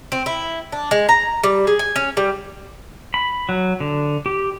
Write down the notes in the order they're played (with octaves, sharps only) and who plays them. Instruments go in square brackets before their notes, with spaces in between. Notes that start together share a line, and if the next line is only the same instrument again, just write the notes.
[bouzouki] C4
E4
D4
G#3
A#5
G3
G#4
G#5
C#4
G3
[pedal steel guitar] B5
F#3
D3
G4